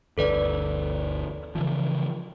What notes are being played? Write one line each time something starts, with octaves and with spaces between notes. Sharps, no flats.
G1 D2 D3 A4 B4 D5
C#3 E3 F3